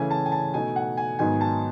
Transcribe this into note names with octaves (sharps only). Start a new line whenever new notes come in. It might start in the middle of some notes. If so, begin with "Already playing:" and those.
Already playing: C#3 E3 A3 C#4 E4 G#5
A5
G#5
A5
B2 A3 D#4 G#5
F#5
G#5
G#2 D#3 F#3 B3 D#4 G#5
A5